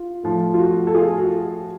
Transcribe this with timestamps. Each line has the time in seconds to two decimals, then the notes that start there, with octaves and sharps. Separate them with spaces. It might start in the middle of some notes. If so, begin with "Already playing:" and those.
Already playing: F4
0.23 A2 F3
0.54 F4
0.58 F#4
0.87 A4
0.94 F4 G#4
1.18 F#4